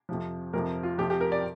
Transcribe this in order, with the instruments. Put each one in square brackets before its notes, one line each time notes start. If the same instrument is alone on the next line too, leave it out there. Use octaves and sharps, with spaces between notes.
[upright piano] F2 C3 F3
F2 C3 F3 A#4
F4
F2 C3 F3 G4
G4
A#4
D5